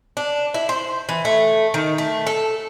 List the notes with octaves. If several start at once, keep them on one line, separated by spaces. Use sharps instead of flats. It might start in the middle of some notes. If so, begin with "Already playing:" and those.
D4
E4
C5
E3
A3
D#3
A3
A4